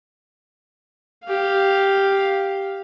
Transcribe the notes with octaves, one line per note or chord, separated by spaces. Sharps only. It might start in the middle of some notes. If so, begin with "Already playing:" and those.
G4 F5